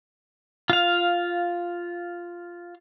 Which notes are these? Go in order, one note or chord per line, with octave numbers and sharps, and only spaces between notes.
F4 F5